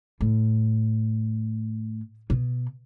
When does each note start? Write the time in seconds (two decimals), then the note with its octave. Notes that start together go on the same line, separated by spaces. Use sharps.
0.21 A2
2.30 B2